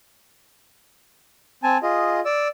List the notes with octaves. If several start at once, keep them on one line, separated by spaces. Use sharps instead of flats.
C4 G#5 A5
F4 G#4 D#5
D5 E6